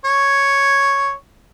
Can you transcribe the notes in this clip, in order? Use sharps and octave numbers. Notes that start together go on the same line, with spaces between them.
C#5